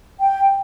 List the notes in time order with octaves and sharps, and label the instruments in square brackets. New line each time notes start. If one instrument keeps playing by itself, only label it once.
[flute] G5